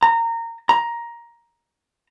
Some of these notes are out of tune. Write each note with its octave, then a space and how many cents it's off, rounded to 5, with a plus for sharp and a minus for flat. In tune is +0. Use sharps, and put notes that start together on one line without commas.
A#5 -20
A#5 +10